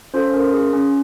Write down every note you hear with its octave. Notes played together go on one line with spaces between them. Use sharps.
C#4 F4 A4 C5
C#4 A#4
F4 G#4
C#4